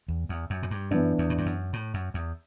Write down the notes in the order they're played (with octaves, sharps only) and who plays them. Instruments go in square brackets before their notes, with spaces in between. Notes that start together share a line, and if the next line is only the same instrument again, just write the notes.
[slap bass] E2
E2
F#2
A2
G2
[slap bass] F#2 [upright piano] E3 B3 D4
[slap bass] E2
A2
G2
F#2
A2
F#2
E2